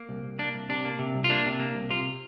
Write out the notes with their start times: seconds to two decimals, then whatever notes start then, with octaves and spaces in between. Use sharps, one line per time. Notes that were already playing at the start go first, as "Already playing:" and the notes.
Already playing: A#3
0.09 C2
0.23 C2
0.39 A#3 D4
0.54 C2
0.69 C3 D4
0.85 A#3
0.99 C3
1.14 C2
1.24 F4
1.30 A#3 D4
1.46 C3
1.60 A#3
1.75 C2
1.90 C3 F4